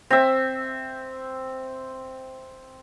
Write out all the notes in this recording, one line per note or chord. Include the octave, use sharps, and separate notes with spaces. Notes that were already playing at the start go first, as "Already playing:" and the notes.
C4 E5